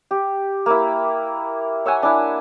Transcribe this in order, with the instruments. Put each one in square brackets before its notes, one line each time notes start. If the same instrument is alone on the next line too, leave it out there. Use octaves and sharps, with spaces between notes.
[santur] G4
A#3 E4
C#5 E5 F#5 G#5
D4 E4